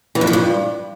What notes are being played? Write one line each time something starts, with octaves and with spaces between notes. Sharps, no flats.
E3
F2
F3
G2